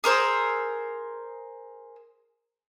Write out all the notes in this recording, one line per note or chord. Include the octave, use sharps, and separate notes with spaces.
G#4 A#4 C5 E6